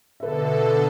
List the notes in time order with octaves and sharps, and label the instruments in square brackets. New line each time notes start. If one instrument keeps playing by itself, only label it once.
[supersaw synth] B2 D3 A4 [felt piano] B4 E5